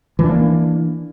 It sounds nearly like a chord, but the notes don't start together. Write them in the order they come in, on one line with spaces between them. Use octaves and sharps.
E3 D4 A#3